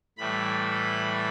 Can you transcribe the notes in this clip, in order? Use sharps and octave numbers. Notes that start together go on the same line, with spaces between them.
A2 E3 G3 B5